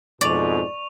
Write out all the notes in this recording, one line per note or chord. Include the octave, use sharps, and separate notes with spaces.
F2 G#2 B2 D5 C#6 F7